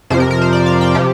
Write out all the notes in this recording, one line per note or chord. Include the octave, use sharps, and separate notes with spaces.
F2 C3 F3 C5
A#4
A#4
C5
D5
F5
G5
C3 F3 G4